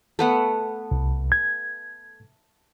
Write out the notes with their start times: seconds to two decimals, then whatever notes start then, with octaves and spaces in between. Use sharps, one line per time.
0.19 A3 B3 F#5
0.91 C2
1.32 G#6